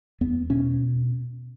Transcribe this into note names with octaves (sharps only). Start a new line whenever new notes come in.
E2 B3
B2 C#4